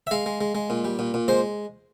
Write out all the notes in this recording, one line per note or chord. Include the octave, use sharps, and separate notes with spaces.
E5
G#3 F5
G#3
G#3
G#3
A#2
G3
A#2
A#2
G#3 C5